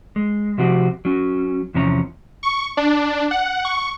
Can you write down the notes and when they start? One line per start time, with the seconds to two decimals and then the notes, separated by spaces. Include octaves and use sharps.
0.16 G#3
0.58 C3 F3 C4 F#4 G4
1.05 F#3 C#4
1.74 E2 C3 F3 C#4 A#5
2.43 C#6
2.77 D4
3.31 F#5
3.65 C#6